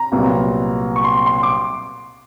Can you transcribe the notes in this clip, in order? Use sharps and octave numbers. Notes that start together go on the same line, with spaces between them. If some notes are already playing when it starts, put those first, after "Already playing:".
Already playing: A#5
C2 A#2 F#3 B3
C#6
C6
C6
D6